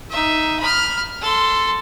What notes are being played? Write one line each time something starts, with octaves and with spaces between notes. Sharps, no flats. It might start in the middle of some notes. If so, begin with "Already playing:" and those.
D#4 E5
B5 F6
A4 C6